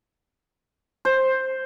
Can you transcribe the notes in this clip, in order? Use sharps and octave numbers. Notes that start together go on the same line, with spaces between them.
C5